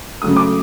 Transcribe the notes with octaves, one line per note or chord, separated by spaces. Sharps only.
C#3 F#3 A3 D#6
D6